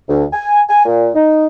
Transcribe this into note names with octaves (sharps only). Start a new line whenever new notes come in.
D2
G#5
G#5
A#2
D#4